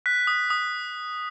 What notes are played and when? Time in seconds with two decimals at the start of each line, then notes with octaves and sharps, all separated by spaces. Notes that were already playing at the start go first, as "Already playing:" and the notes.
0.06 F#6 B6
0.27 D#6
0.50 D#6